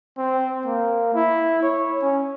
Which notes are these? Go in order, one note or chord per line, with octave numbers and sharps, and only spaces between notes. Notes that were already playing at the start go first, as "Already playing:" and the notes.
C4
A#3
E4
C#5
C#4